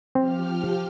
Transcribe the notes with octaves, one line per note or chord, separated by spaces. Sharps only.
F3 C4 G4 F6